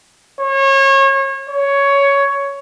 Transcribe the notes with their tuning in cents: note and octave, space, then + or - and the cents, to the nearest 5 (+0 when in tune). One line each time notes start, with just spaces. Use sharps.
C#5 -30
C#5 +10